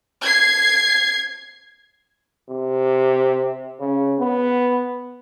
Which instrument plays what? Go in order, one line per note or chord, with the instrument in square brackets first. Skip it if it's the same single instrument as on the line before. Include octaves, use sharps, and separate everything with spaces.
[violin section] G#6 C7
[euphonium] C3
C#3
B3